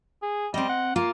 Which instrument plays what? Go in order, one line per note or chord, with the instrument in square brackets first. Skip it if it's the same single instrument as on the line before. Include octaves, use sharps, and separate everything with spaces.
[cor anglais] G#4
[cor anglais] G3 [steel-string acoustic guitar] C4 D#5
[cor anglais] F#5
[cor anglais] A#3 [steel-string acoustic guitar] F4